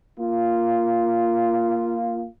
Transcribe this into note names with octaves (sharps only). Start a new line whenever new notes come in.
A#3 F4